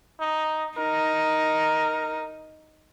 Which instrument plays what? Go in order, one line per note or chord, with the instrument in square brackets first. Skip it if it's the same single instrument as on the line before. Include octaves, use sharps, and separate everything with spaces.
[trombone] D#4
[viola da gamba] D#4 [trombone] A#4